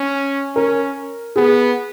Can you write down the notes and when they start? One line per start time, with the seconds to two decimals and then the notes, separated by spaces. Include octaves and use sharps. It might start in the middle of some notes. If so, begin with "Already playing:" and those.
Already playing: C#4
0.55 C#4 A#4
1.36 B3 G#4